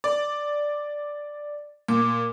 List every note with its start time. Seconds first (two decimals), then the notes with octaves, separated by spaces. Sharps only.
0.04 D5
1.88 A#2 D6